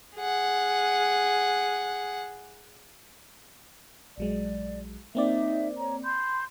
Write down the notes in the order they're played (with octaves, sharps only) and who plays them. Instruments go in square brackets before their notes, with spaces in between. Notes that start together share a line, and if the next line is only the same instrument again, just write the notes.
[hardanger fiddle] G#4 F#5
[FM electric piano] A#1 F#3 G#3 [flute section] D5
[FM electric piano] A#3 C4 D5 [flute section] D#4 E5
[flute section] C#5 A#5
B5 C6 G6